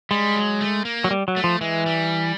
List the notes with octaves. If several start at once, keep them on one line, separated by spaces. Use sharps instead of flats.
G3 G#3
F#3
A3
A#3
F#3
G3
F#3
A3
F3
E3 G#3
G3